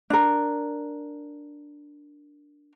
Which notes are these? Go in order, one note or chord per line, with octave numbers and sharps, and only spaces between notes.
D4 A#4